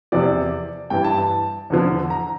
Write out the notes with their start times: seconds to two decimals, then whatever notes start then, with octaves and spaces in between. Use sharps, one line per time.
0.12 E2 C3 F3 D5
0.90 G2 E3 G5
1.04 A5
1.18 A5
1.70 E2 D3 F3
2.10 A#5